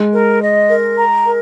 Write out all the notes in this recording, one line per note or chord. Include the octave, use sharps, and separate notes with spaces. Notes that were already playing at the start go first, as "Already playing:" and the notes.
Already playing: G#3
A#4
D#5
A#4
A#5
A#4